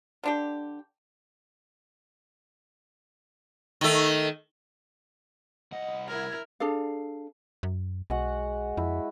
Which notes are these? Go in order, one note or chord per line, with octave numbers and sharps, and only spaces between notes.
D3 D4 G4
D#3 A3
C2 D#5 F#5
E4 A#4 G#6
D4 G#4 A4 F5
F#2
B1 G#3 F#4 F#5
F2 E4